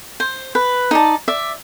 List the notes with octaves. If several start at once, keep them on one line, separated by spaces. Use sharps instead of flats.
C5
B4
D#4 D5 A5
D5 E5